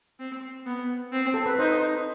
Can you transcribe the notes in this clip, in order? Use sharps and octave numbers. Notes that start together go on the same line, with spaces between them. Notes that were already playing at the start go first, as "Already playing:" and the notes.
C4
B3
C4
A4
B4
D#4 C5